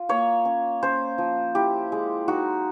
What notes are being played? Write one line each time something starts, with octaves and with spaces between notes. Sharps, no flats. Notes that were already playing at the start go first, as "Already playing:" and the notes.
Already playing: F4
A#3 C#5
C#4
C#4 C5
F3
E4 G4
G#3
D#4 F#4